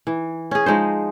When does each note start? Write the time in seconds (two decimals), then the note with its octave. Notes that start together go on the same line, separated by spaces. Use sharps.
0.07 E3
0.51 C#4 G#4
0.66 F3 G#3 D#4 C5